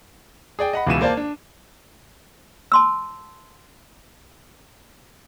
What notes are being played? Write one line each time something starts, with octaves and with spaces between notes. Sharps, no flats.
G#4 D5 G5
D#5 F#5 B5
C#2 B2 E3 E4 D#7 E7
A#3 C5 D5 A5
D4
A5 C6 E6